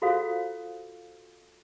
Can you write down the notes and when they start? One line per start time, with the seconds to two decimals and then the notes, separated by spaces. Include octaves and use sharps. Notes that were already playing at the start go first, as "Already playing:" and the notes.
0.02 F4 F#4 A4 C5 F5